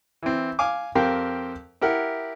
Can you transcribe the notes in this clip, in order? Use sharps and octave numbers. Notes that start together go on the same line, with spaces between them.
E3 C4
F5 G#5 D6
F2 C4 G4 A#4 F5 G5
E4 G4 A#4 F#5